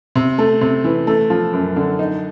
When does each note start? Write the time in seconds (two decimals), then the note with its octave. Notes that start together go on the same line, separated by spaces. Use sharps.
0.15 C3
0.38 A3
0.61 C3
0.84 E3
1.07 A3
1.30 F3
1.53 F#2
1.76 D3
1.99 D#4